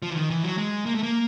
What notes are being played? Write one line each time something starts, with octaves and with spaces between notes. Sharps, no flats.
F3
E3
D#3
E3
F#3
G#3
A#3
A3
A#3